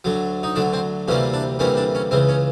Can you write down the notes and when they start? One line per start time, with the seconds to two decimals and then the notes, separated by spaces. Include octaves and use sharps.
0.04 D2 D3 F#3
0.43 D#4
0.55 D2 D3 F#3 D4
0.73 C4
1.08 D2 C3 E3 G3 A#3 C#4
1.33 D4
1.59 D2 C3 E3 G3 A#3 C#4
1.77 D4
1.95 C#4
2.11 C#2 C#3 E3 C4
2.29 C#4